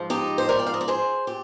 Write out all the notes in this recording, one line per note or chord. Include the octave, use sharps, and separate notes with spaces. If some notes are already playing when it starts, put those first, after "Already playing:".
Already playing: G#2 F3
D#4 G4
C5
A#4 D5
G5
F5
D#5
D5
G#4 C5
A#2 G4